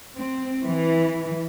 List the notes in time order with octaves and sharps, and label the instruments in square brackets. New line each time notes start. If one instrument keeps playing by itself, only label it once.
[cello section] C4
E3